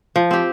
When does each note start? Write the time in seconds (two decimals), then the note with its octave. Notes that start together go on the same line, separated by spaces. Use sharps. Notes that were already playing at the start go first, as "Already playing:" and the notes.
0.16 F3
0.31 C4 G4